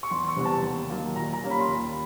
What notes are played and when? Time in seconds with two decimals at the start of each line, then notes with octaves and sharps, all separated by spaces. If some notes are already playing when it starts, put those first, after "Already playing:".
0.03 C#6
0.11 E2 C6
0.29 C#6
0.36 C3 E3 G3 B3
0.45 A5
0.63 D#2
0.90 D#3 F#3 A#3
1.15 A#2 A#5
1.33 A#5
1.42 G3 A#3 C#4
1.51 B5
1.60 C6
1.68 D#2 B5